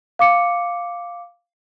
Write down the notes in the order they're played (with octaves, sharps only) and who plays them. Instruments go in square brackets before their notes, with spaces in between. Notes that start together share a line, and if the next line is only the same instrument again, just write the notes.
[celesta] F5 D6 C#7